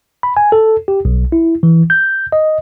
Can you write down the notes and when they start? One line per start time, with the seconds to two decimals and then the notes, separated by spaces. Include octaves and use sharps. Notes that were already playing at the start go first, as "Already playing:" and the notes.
0.23 B5
0.37 G#5
0.52 A4
0.88 G4
1.05 B1
1.32 E4
1.63 E3
1.90 G6
2.32 D#5